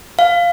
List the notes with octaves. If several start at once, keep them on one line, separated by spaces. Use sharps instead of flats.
F5